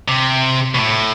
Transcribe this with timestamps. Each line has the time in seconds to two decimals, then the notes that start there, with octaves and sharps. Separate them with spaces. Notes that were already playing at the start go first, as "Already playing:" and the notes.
0.08 C3
0.75 B2
0.78 A2